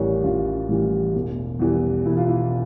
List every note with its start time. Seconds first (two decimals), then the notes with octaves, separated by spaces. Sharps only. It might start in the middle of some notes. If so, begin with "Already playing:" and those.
Already playing: A1 A2 E3 G3 A#4 C#5 D5
0.24 A1 F4
0.69 A2 E3 G3
1.14 E1
1.60 E2 E3 G3
2.06 E1 E4
2.17 F4
2.28 E4